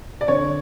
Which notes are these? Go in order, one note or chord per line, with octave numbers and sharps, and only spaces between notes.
D5
D3 C#5